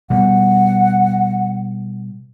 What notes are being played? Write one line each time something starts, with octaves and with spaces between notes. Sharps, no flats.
B2 G3 F#5